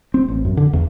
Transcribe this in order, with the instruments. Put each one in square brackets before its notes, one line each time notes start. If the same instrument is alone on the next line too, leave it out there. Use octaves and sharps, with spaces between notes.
[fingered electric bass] C4
A1
F#2
D3
E2